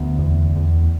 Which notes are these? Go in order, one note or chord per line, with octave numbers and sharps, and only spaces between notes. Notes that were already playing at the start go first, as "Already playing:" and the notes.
Already playing: D2 B3
E2
E2